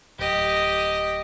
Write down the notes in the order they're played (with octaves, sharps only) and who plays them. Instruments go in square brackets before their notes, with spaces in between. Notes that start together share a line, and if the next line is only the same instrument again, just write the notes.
[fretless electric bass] D1 [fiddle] G4 D#5